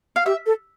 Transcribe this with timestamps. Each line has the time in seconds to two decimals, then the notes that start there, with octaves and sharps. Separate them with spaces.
0.16 F5
0.26 G4 E5
0.46 A4